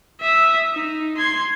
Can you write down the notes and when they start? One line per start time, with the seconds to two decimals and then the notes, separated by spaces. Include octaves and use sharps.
0.21 E5 D#6
0.74 D#4
1.17 C6 G#6